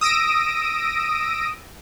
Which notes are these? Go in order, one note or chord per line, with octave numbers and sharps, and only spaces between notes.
D#6 E6 A#6 D7 D#7